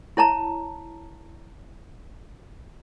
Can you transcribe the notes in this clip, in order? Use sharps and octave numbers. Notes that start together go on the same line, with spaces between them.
E4 C#5 A5 A#5